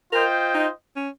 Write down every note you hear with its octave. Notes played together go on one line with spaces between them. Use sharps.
F4 A#4 C5 D#5 G5
D#4
C#4